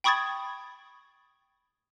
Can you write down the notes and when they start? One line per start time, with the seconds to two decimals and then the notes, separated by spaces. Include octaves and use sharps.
0.04 G5 B5 C#6 D#6 G#6 A6